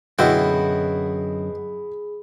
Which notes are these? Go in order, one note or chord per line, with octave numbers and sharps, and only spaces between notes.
F#2 B2 D3 E4 F#4 G#4 G5 B5